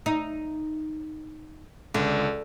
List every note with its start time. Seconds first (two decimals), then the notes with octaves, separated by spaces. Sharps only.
0.06 D#4
1.94 C#2 D3